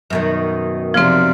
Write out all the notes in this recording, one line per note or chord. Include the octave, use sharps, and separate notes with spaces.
F#2 B2 D#3
C3 F3 C4 D5 F6